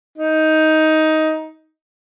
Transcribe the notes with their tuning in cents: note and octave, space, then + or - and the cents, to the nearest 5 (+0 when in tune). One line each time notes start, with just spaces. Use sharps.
D#4 +10